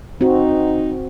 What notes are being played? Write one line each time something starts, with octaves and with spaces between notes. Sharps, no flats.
C4 D#4 F#4